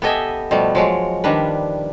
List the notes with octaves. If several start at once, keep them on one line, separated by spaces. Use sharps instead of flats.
B3 G4 A4 D#5 E5 G#5
B2 F3 G3 A3
F3 F#3 G#3
D#3 F3 G3 D4 B4